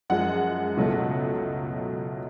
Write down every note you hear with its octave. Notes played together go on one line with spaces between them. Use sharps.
F#2 F3 G#3 F#5
C#2 B2 F#3 A3